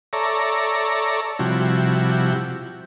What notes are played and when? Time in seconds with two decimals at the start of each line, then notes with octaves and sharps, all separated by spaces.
0.13 A4 C#5 D5 E5 A#5
1.39 C3 F3 G3 E4 F#4